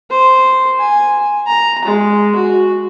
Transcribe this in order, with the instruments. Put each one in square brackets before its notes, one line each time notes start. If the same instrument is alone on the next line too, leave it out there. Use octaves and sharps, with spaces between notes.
[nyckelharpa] C5
G#5
A#5
G#3
F#4